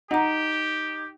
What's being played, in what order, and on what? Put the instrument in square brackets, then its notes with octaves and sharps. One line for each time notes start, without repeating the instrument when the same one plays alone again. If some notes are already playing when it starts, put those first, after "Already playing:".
[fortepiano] D#4 [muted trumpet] G4 [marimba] F#5 A#5